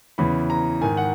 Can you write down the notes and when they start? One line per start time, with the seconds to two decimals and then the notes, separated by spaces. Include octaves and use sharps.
0.18 E2 C#3 E3 B5
0.50 A#5
0.81 G#2 D#3 G#5
0.97 F#5